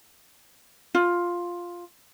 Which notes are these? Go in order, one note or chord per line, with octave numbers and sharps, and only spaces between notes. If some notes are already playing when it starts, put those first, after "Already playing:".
F4